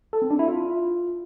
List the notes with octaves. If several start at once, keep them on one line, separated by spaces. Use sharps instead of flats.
A4
C4
D4
E4
F4